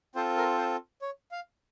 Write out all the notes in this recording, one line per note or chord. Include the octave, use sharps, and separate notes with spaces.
C4 F4 A4 C5
A#4
C5
C#5
F5